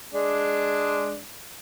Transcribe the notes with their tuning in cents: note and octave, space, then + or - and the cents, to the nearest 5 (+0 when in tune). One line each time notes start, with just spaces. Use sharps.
G#3 +0 D4 +0